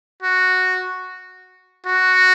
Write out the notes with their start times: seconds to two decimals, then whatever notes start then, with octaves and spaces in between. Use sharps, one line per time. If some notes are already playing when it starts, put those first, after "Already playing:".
0.22 F#4
1.87 F#4